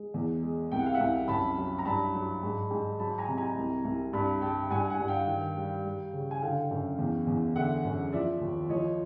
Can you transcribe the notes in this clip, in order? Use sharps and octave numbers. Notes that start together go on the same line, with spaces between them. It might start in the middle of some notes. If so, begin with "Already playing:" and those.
Already playing: G#3
E2
G#3
C2 G5
F#5
F5
E5 F#5
C2
F#2 A5 B5
F#3
A#5
G2 A5 B5
F#3
G#2
G#2
F#3 A5 B5
G#5 A#5
C3
G#5 A#5
C2
C2
G2 A5 B5
G3 G5 A5
G2 F#5 G#5
F#5 G#5
G2
F5 G5
D#3
G3
G3
C#3
G#5
D3 F5 G5
F#2
E2
E2
D3 E5 F#5
F#2
F3 D5 E5
D#2
F3 C#5 D#5